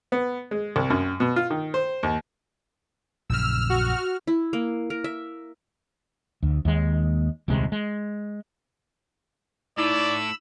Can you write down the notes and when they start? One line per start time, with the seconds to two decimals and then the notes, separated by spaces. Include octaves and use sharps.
0.12 B3
0.51 G#3
0.76 C2
0.90 F#2
1.20 B2
1.36 F4
1.50 D#3
1.74 C5
2.03 D#2
3.30 A#1 F#2 C#3 E6 F6
3.70 F#4 F6
4.27 E4
4.53 A#3
4.90 A#4
5.04 E5
6.42 D2
6.65 D#2 G#3
7.48 D#1 C2 C3 G#3
7.72 G#3
9.78 A2 D#4 E4 D5 B5 D6 E6